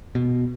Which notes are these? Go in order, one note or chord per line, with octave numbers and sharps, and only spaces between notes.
B2